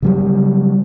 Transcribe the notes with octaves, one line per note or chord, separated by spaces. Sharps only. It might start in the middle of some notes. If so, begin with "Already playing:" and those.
C#3 F#3 G3